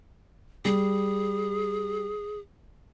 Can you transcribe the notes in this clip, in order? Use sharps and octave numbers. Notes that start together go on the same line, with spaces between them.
G3 G#4